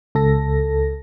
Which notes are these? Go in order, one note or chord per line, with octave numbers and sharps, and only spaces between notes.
C#2 A4 A#6